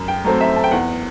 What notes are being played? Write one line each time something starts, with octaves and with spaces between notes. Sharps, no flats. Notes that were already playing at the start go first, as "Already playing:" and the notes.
Already playing: F#2
G5
F#3 A3 C4
E5
A5
G5
E2 F#5